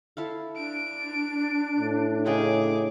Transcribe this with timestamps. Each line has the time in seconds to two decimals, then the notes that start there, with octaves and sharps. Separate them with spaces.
0.17 E4 A4 F5
0.57 D4 D7
1.78 A2
2.26 C#3 D#4 G#4 G5 D6